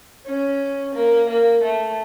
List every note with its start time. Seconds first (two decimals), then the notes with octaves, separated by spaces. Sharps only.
0.25 C#4
0.94 A#3
1.28 A#3
1.63 A3